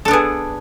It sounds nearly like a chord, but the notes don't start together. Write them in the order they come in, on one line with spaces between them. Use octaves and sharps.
A4 D4 B3 G#4